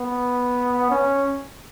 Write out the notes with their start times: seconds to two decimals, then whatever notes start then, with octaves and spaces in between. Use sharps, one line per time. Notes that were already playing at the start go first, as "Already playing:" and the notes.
Already playing: B3
0.90 C#4